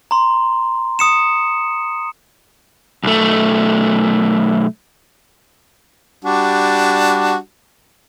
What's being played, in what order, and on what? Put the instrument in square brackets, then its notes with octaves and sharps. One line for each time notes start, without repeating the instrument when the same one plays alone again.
[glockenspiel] A#5 C6
D#6 C#7 E7
[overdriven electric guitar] B1 A3
[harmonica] G3 D4 F#4